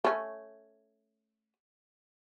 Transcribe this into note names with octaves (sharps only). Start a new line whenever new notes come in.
A3 C#4